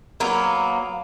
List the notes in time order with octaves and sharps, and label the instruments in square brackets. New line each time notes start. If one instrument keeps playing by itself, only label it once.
[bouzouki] F#3 A#3 B3